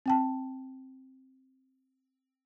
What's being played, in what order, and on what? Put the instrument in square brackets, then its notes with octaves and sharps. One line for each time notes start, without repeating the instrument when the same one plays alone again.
[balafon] C4 G5 A5